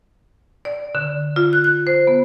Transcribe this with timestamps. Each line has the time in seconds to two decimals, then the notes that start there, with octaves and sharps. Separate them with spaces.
0.65 D5
0.95 D3
1.36 F4
1.53 F#6
1.64 F#6
1.87 C5
2.07 B3